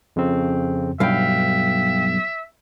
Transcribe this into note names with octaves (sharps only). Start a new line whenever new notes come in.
F2 C#3 C4
B1 G2 E5 F5 G5